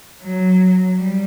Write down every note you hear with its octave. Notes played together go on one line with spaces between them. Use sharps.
F#3
G3